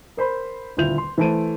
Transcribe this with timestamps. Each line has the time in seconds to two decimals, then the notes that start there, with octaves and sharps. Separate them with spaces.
0.17 A#4 C5 B5
0.77 D#1 D2 E4 F4 G6 F7
0.98 C6
1.18 E3 A3 C5 A5 D7 D#7